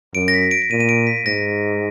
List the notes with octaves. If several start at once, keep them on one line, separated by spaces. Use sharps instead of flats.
F#2 D7
A#6
B6
D7
D7
A#2 D#7
D#7
D7
B6
G#2 A#6